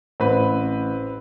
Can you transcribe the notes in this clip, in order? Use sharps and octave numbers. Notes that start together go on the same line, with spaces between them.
A1 C4 B4